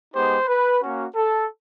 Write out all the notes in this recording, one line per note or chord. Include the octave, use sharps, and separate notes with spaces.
G#3 B3 D#4 G4 C5
B4
A#3 C#4 F#4
A4